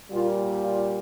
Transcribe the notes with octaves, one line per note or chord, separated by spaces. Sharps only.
A#2 G3 F4
F4